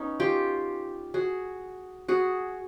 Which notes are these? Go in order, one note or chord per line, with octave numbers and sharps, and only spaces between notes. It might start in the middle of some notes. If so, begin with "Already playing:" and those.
Already playing: B3 C#4 D#4
F4 G4
F#4 G#4
F#4 G#4